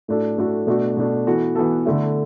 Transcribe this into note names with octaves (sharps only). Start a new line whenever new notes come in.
A2 A3 D4 F#4 A4
A2 A3 D4 F#4 A4
B2 A3 D4 F#4
B2 A3 D4 F#4
E3 B3 F#4 A4
E3 B3 F#4 A4
D3 A3 E4